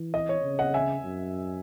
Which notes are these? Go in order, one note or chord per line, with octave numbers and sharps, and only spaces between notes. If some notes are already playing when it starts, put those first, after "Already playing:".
Already playing: E3
D#5
C#5
C#3
D#5 F#5
E5 G#5
F#2